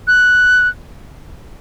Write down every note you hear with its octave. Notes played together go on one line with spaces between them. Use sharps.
F#6